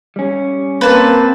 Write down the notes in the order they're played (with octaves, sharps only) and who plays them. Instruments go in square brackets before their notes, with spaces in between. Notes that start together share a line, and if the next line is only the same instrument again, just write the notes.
[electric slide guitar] G3 C#4
[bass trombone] A#3 [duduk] C4 [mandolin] B4 A5